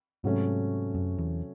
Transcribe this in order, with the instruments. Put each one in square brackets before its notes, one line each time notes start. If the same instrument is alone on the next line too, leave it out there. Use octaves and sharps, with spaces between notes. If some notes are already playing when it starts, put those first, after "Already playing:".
[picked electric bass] G#2 [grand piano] C3 F#3 A3 C#4
[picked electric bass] F#2
E2